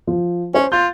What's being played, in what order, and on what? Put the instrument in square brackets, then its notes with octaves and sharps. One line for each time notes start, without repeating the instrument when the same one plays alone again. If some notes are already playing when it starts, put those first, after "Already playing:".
[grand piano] F3
[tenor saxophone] C#4 [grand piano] C5
[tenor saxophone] F4 [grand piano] G6 A6